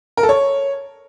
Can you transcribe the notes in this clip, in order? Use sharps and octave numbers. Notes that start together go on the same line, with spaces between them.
A#4
A4
C#5